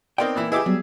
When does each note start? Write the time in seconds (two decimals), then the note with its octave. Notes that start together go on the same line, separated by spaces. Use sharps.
0.18 B3 C4 D#4 A#4 D5 F5 G5
0.36 A#2 E3 E4
0.52 E4 G4 G#4 B4 D#5 E5 G#5 D6
0.66 F#3 G3 B3